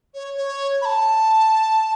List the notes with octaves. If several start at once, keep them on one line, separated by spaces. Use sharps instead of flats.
C#5
C#5
B5
A5